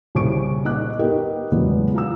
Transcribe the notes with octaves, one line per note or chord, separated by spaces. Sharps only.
C2 C#3 C4 C#6 D7
A#2 D#4 D#5 D6 F#6
B3 D#4 G4 A#4 D#5 G5
E2 A2 C#3 F#3 G#3 B3
F4 A#5 E6